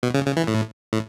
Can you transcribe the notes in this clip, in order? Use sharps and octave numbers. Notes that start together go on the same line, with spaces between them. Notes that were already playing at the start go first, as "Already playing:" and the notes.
B2
C#3
C#3
E3
A2
A2